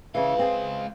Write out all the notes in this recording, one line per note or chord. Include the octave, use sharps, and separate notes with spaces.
C#2 C#3 E3 F5
C4 G#4